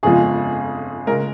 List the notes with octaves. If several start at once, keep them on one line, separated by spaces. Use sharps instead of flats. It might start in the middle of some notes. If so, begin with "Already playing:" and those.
G1 F2 C#3 F3 G#3 G#4
C#3 G#3 A#4